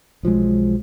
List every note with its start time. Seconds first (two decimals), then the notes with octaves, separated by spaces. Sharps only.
0.23 B1 F3 F#3 G#3